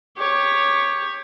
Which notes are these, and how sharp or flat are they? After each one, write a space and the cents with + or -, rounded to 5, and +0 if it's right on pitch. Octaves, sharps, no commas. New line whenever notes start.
G4 +15 C#5 +0